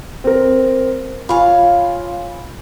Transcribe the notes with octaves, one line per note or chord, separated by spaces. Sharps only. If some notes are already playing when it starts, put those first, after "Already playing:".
C4 A#4
F4 C#5 F5 G#5 B5